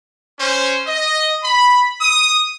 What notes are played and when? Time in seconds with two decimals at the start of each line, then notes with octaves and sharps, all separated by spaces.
0.39 C#4 C5
0.86 D#5
1.43 B5
2.01 D#6